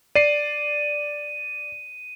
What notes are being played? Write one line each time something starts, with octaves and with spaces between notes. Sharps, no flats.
D5 C7 D#7